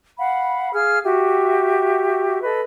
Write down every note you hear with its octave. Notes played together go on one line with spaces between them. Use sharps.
F5 F#5 B5
G#4 F5 F6
F#4 G4 E5
A4 B4 D#5